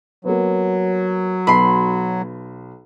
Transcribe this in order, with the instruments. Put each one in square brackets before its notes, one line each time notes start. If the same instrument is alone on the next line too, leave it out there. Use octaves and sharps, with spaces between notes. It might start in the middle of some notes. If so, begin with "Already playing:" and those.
[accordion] F#3 [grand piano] A#3 B3
[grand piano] B1 B3 A5 [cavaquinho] B5 C6